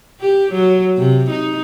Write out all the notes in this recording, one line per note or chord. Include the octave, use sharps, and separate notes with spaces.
G4
F#3
C3
D#4